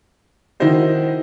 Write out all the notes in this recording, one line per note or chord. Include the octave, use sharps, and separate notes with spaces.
D#3 D#4 E4 F#4 C5 D#5